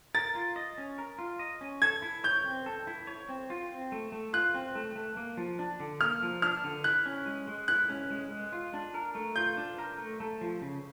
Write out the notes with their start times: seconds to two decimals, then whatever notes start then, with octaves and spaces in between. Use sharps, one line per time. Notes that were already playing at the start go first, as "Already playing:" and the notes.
0.15 A#4 A6
0.35 F4
0.56 D#5
0.78 C#4
0.98 A#4
1.18 F4
1.39 D#5
1.61 C#4
1.82 A4 G#6
2.02 E4
2.24 C#5 G6
2.44 C4
2.66 A4
2.87 E4
3.07 C#5
3.29 C4
3.50 F4
3.71 C4
3.92 A3
4.12 A3
4.33 F4 F#6
4.54 C4
4.75 A3
4.96 A3
5.17 A#3
5.37 F3
5.59 D4
5.80 D3
6.01 A#3 F6
6.22 F3
6.42 D4 F6
6.64 D3
6.84 E4 F#6
7.06 C#4
7.26 G#3
7.47 G#3
7.68 E4 F#6
7.89 C#4
8.10 G#3
8.31 G#3
8.52 F4
8.74 D4
8.94 A#4
9.15 A3
9.36 F4 G6
9.57 D4
9.78 A#4
9.98 A3
10.20 A3
10.41 F3
10.62 C#3